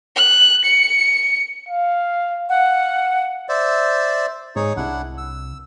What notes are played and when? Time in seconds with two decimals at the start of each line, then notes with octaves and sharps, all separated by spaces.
0.16 F#6
0.64 C#7
1.69 F5
2.48 F5 F#5
3.49 C5 D5 E5
4.56 G#2 D#4 G#4 C#5
4.77 C2 D4 E4 F#5
5.18 E6